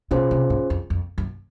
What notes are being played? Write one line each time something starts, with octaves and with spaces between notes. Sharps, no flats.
B2 C#4 F4 G#4 C5
C3
G#2
F2
F2
F#2